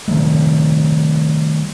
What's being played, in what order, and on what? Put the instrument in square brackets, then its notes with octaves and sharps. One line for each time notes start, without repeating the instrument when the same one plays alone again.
[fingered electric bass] D#3 G3 A3